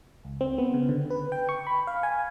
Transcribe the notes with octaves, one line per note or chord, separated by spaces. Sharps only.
C#2
C4
B3
C#3
D3
B4
G5
C#6
B5
F5
G#5